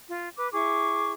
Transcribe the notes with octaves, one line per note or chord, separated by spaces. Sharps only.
F4
B4 D6
E4 G#4 C#6 D6